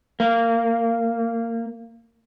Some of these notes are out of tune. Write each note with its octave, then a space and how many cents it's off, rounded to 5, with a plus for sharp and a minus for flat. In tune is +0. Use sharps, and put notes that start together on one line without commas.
A#3 -20